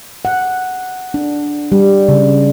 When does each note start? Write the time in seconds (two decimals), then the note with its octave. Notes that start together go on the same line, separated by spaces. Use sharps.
0.25 F#5
1.14 D4
1.72 G3
2.09 C#3